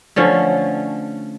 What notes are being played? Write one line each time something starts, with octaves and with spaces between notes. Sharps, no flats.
D3 F3 A3 C#4